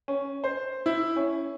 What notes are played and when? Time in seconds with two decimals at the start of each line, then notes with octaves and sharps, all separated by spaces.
0.08 C#4
0.44 C5
0.86 E4
1.16 C#4